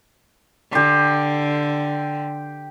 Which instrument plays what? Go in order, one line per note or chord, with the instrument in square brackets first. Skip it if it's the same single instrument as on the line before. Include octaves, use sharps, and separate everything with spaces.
[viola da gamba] D3 [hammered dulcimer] G4 C6